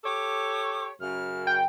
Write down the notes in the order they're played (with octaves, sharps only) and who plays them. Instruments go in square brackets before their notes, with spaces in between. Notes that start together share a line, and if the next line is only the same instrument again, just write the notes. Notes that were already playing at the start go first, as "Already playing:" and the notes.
[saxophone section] G4 A4 C#5 [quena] D6
[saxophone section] F#2 C#3 [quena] F6
[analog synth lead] G5